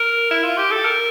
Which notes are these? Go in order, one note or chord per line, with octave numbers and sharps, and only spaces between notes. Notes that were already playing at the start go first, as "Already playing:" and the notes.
Already playing: A#4
E4
F4
G4
A4
A#4